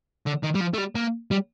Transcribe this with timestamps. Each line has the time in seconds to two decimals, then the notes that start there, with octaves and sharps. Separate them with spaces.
0.27 D3
0.44 D#3
0.55 G3
0.61 F3
0.74 A3
0.78 G3
0.95 A#3
1.31 G3